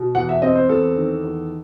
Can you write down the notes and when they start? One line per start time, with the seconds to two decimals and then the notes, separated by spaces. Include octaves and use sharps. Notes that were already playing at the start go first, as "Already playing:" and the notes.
Already playing: B2
0.15 E2 F#5
0.29 E5
0.42 C4 D#5
0.56 C5
0.69 E2 A4
0.96 D#3
1.24 E2